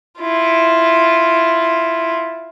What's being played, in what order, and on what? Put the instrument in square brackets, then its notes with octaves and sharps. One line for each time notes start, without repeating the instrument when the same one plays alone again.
[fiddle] E4 F4